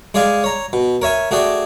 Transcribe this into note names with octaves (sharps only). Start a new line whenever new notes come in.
G#3 G#4 D5 F5 G#5
C#5 A#5
B2
A#4 C#5 E5 G#5
A3 F#4 G#4 D5 G5